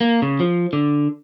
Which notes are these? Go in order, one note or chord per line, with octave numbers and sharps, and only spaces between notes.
A#3
C#3
F3
D3